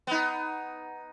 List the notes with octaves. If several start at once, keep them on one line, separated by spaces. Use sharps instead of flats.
B3 D#4